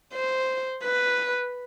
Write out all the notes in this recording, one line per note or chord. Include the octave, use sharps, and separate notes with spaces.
C5
B4